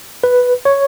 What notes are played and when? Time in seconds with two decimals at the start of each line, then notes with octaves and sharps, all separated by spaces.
0.24 B4
0.65 C#5